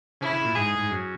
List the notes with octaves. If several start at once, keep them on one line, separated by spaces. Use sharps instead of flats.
C#3 E4
C#3
A#2
G#2 G#4
G#2
F#2